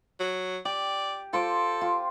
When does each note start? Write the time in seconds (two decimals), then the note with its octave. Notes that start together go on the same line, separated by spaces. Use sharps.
0.20 F#3
0.65 G4 D5
1.33 F4 A4 C5 D6
1.81 F4 G4